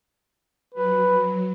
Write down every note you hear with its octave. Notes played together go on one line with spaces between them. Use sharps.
F#3 B4